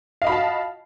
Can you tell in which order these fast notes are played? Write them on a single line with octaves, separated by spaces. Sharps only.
F5 D#5 B5 F#4 A5